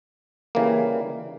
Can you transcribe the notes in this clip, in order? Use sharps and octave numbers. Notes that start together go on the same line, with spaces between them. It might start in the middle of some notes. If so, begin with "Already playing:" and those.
C#3 E3 G3 A#3